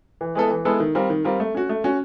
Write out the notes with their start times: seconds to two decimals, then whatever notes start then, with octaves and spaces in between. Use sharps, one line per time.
0.21 E3
0.35 G#3 B3 E4 A4
0.51 E3
0.65 G#3 B3 E4 A4
0.80 D#3
0.95 G3 C4 F4 A#4
1.10 D#3
1.25 G3 C4 F4 A#4
1.40 A3
1.55 C#4 F#4
1.69 A3
1.84 C#4 F#4